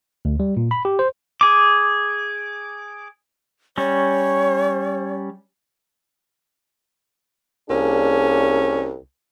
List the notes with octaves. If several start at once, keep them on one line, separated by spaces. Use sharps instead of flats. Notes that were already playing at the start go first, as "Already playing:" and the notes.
D2
G3
A#2
B5
G4
C5
G#4 D6
G3 C#4 C#5
C2 A#3 C#4 D4 G#4